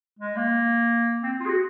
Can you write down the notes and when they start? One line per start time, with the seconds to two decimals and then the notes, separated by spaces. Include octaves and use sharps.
0.19 G#3
0.36 A#3
1.23 C4
1.40 F4
1.45 G#4
1.49 F#4